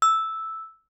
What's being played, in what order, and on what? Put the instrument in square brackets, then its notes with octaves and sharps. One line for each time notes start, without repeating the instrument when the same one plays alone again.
[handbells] E6